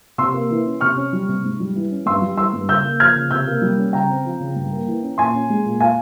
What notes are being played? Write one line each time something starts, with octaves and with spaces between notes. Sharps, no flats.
C3 C6 E6
A#3
E3
C#4
C3 C#6 F6
C#4
G3
C3
G#2
G3
E3
C#4
G2 C6 E6
G3
E3 C6 E6
G2
C#3 E6 G6
A#3
F3 F6 G#6
C#3
C3 E6 G6
A#3
G3
C#4
C#3 G5 A#5
C4
F3
C#3
G2
A#3
E3
C#4
A#2 G#5 C6
C#4
G#3
A#2
F5 G#5